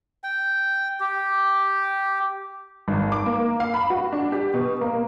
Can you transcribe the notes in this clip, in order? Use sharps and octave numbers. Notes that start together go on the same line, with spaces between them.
G5
G4
G#1
D6
A#3
F5
B5
F#4
D4
G4
B2
A#3